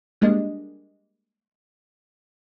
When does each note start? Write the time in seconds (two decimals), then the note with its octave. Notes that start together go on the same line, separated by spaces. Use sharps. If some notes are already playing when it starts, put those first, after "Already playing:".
0.21 G3 G#3 A#3 D4 D#5